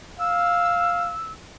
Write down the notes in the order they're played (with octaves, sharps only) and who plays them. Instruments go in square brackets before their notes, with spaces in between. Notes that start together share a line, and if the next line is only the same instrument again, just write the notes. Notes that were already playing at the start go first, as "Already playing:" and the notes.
[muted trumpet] F5 [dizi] E6